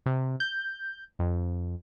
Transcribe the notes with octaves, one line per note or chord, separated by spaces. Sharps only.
C3
G6
F2